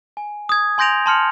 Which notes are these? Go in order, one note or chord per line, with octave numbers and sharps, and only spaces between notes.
G#5
D#6 G#6
G#5 C6 G6 A#6 D7 F7
A5 C6 F6 C#7 F7